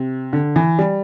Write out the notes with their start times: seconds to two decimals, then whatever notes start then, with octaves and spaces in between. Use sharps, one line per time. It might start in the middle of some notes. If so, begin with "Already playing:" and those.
Already playing: C3
0.33 D3
0.56 E3
0.79 G3